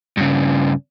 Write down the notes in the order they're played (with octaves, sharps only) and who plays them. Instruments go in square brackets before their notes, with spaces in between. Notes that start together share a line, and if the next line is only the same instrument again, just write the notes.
[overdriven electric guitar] G2 C#3